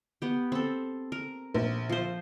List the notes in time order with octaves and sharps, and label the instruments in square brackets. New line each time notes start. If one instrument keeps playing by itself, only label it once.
[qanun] B3 G4
C4 A4
A#4
[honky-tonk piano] A#1
[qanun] F3 C5